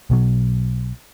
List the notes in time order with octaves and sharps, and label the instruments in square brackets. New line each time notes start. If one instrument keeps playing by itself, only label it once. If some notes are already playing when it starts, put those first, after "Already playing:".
[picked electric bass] B1 B2 F#3